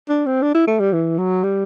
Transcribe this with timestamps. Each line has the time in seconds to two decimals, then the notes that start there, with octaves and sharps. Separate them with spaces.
0.09 D4
0.26 C4
0.42 D4
0.54 E4
0.67 A3
0.80 G3
0.93 E3
1.18 F#3
1.43 G3